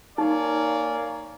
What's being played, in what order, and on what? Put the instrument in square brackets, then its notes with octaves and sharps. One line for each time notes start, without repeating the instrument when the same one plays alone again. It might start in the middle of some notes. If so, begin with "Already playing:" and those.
[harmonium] A#3 F5 G#5 [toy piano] D#4 [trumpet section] A#4 C#5 D5